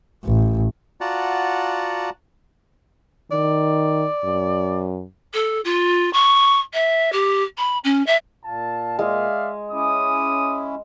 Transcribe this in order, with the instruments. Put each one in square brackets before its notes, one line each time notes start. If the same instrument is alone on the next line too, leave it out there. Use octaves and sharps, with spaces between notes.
[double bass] A1
[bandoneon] F4 F#4 D5 F#5 A5 A#5
[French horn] D#3 [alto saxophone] D5
[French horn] F#2
[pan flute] A4
F4
C#6
E5
G4
B5
C#4
E5
[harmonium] A#2 [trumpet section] F5 A5
[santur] G#3 [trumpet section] D5 E5 F5
[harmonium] C#4 E4 [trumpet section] D6 D#6